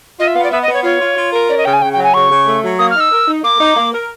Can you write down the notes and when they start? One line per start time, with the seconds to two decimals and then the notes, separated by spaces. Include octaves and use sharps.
0.19 F4 D#5
0.27 E5
0.35 B3 F5
0.43 D5
0.51 B3 E5
0.62 D#5
0.67 B3
0.73 C#5
0.83 F4 C#5
1.00 F4
1.16 F4
1.32 A#4
1.49 C#4 D5
1.57 D#5
1.65 C#3 G5
1.73 G#5
1.81 C#3 G5
1.93 G5
1.97 F#3
2.03 G#5
2.14 C#3 C#6
2.29 C#3
2.46 A3
2.63 F#3
2.79 A#3 D#6
2.90 F6
2.95 D#4 E6
3.11 A#4
3.28 D#4
3.43 A#3 D6
3.60 D#4
3.76 A#3
3.93 A#4